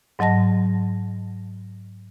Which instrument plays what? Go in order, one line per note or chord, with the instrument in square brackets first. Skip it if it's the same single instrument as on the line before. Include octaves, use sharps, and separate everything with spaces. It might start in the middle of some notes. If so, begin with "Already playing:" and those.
[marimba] G#2 F#3 D#5 A5 A#6